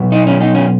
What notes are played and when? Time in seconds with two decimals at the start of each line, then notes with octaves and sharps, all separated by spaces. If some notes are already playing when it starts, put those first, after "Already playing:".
Already playing: B2 F#3
0.12 D#4
0.27 C#4
0.41 D#4
0.55 C#4